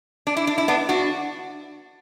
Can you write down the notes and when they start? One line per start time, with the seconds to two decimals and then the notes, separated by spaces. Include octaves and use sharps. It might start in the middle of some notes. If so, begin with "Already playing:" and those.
0.27 D4
0.37 E4
0.47 D4
0.58 E4
0.68 B3 D4
0.89 D4 F#4